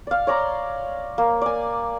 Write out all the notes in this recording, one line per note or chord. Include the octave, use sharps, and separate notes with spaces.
D5 F5
C#5 D5 A#5 C6
A#3
D5 G#5